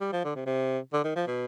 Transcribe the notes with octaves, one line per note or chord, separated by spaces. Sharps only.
G3
F3
D3
C3
C3
D3
D#3
F3
B2